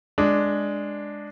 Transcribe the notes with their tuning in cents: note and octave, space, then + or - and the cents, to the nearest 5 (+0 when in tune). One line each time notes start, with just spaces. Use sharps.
G#3 +0 D4 +0